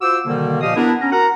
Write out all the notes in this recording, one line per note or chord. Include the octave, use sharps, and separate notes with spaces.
F4 F#4 C5 D6 E6
B2 D3 D#3 G3 A#3
A#2 F3 G4 D#5 F5 D#6
B3 D4 E4 A#4
C#4 A#5
F#4 A#4 F#5 A#5